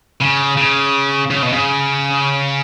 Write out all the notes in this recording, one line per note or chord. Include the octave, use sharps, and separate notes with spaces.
C#3
C#3
C#3
B2
C#3